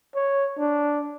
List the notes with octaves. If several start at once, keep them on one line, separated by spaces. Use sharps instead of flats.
C#5
D4